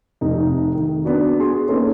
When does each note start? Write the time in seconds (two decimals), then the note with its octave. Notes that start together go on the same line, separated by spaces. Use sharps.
0.21 F1 C3 D#4
0.74 D#3
1.05 B3 D4 F#4
1.40 G#4 C6
1.68 A#3 C#4 D#4 A4 B4